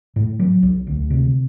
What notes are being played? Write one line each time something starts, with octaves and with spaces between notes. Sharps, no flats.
A2
F#3
B1
D2
C3